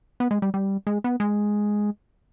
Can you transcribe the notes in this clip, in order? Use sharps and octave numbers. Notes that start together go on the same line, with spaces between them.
B3
G#3
G3
G3
G#3
B3
G#3